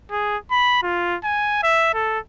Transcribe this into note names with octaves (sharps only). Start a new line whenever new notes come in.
G#4
B5
F4
G#5
E5
A4